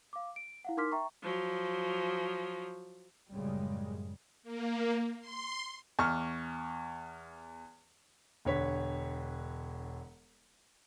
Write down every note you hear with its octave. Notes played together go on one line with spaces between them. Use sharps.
F5 D6
D7
E4 F5 F#5
D#4 A#4 C6 D6 F6 B6
E5 G5 A#5 C#6
F3 F#3
F#1 F#2 A2 C#3 G3 G#3
A#3
C6
E2 C#6 F6
E1 D3 C#5 B6